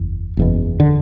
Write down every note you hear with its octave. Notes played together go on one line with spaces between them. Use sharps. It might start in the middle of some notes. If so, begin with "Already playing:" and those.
Already playing: F#1 E2
F#1 E2 B2
D3